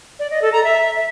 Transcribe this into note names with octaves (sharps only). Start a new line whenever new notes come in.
D5
D#5
A4
A#5
E5